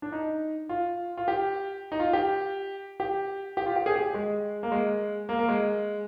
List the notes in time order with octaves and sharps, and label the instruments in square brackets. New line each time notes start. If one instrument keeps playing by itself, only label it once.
[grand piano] D4
D#4
F4
F4
G4
D#4
F4
G4
G4
G4
F4
G4
G#4
G4
G#3
A#3
G#3
A#3
A#3
G#3